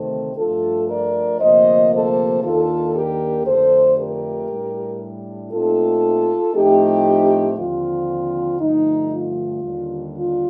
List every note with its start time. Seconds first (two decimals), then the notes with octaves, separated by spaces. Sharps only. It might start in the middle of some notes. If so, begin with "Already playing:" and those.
Already playing: D2 C3 D#3 A3 C4 A4 C5
0.36 G2 F3 A3 D4 F4 A4
0.88 A#4 D5
1.39 D2 C3 F3 A#3 C5 D#5
1.91 A4 C5
2.42 D#2 D#3 A#3 D4 F4 A4
2.94 G4 A#4
3.45 F2 D3 A3 D4 A4 C5
3.97 G4 A#4
4.48 A2 G3 D4
5.51 A#2 A3 C4 D#4 F4 A4
6.54 A2 F3 A3 C4 D#4 G4
7.56 D#2 D3 F3 C4 F4
8.60 G2 D3 F3 A3 D#4
9.11 F4
9.62 D#2 D3 G3 D4
10.14 F4